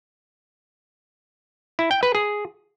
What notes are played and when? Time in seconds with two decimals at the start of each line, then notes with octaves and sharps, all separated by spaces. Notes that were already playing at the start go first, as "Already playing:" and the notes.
1.79 E4
1.91 G5
2.03 B4
2.15 G#4